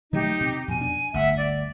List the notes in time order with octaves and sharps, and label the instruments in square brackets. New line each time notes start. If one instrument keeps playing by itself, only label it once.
[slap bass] D#3 F#3 A3 [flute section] D#4 G4
[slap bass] C3
[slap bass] F2 B2 [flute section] G#5
[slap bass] D4
[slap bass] G1 D2 [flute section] E5 F#5
[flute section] D5